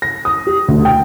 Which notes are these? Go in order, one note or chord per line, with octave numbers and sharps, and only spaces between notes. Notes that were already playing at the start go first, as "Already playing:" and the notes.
A#6
D#6
G4
D2
G5